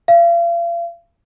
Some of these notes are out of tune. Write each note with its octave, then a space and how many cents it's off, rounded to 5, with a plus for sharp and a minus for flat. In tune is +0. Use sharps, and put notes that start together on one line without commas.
F5 -40